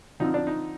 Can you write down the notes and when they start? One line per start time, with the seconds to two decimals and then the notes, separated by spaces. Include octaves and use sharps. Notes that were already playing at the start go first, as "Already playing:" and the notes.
0.20 D3 F3 C4 D#4
0.34 D4
0.47 D#4